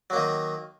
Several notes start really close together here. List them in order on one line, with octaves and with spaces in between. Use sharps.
F#3 A#3 D#3